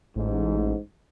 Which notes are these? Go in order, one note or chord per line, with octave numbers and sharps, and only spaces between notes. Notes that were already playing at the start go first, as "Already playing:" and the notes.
A1 G#2